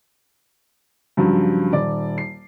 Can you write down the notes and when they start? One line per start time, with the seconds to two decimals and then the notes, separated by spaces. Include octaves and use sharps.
1.17 G2 C#3 F3 F#3
1.73 D#1 D5
2.18 C7